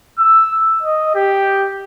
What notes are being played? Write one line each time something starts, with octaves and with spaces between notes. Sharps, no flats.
E6
D#5
G4